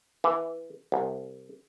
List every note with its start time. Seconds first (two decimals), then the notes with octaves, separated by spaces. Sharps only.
0.24 E3
0.92 C2